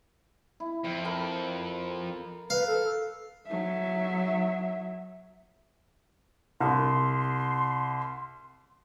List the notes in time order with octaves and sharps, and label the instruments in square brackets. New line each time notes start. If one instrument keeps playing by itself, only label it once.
[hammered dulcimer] E4
[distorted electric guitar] F2 [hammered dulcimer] F5
[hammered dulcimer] A4 A#4 B5
[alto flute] B4 [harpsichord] F5
[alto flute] A4
[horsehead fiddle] F#3 E5
[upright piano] C2 [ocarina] C6